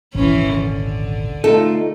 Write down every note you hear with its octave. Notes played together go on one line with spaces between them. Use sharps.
D#1 G#1 C3 E3 C#4
D3
A3 D#4 F4 A4